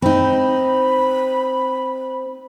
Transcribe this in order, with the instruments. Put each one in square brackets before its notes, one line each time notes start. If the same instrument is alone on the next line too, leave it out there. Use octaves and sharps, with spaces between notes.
[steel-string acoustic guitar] C4 D#4 [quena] B5